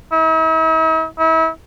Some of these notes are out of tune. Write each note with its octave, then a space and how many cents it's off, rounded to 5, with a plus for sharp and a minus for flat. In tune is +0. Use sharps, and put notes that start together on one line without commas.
E4 -45
E4 -35